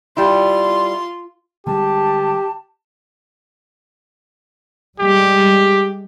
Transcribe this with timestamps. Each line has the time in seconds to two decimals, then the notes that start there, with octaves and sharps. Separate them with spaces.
0.17 G3 E4 F4 C6
1.67 D3 G3 G#3 G4 A5
4.99 G3 G#3 G4